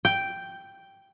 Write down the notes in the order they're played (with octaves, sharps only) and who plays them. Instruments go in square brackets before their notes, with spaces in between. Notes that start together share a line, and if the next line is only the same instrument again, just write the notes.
[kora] G5